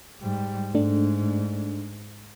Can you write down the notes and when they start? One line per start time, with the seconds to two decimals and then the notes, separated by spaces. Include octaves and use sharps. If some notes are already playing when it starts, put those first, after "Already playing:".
0.21 G#2 G3
0.75 G#2 A3 D4